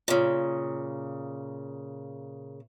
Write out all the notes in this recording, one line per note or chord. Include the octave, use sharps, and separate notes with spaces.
A#2 C#3